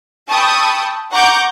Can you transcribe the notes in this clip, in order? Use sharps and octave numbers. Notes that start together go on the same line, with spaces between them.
G5 A5 B5 C#6 D#6 E6
F#5 A#5 C#6 D6 G6